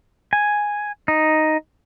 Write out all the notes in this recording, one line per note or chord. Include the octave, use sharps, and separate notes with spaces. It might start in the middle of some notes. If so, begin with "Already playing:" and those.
G#5
D#4